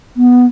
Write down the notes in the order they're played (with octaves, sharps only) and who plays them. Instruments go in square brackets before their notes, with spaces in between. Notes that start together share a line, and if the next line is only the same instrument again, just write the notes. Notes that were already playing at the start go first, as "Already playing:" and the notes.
[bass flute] B3